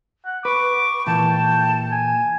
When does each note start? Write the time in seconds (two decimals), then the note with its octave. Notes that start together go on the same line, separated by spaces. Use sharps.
0.26 F#5
0.45 B4 C#6 D6
1.06 A#2 E3 G5 A5
1.92 G#5